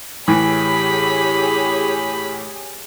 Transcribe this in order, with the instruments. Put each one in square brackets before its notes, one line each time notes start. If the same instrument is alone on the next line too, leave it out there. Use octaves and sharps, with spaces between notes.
[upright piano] A2 E3 [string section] G4 G#4 C#5 [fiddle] B5